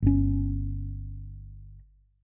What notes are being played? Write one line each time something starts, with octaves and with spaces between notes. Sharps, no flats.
G1 C#4